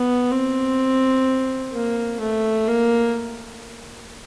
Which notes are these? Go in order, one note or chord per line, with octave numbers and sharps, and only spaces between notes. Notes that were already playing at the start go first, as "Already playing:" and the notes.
Already playing: B3
C4
A#3
A3
A#3